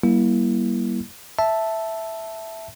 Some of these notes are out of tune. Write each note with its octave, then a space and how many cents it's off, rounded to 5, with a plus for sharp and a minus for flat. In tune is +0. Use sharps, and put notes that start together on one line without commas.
G3 -15 A#3 +30 E4 +0
E5 +0 A5 +0